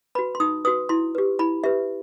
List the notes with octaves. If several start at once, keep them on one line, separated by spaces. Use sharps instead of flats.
F#4 B4 B5
C6
D#4 D#6
F#4 B4 D#6
E4 C6
G4 B4
E4 B5
G4 B4 E5